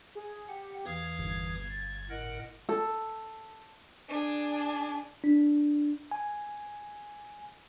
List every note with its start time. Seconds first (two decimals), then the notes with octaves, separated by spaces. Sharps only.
0.15 G#4
0.48 G4 F#5
0.86 E2 E3 F5 D#6 G#6
1.19 G1 G#6
1.69 A6
2.10 A2 A#4 D#5 F#5 D7
2.69 A4
4.09 D4 G#4
5.24 D4
6.11 G#5